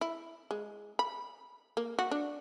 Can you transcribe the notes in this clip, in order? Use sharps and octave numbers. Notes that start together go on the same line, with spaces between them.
E4
G#3
B5
A#3
F#4
D4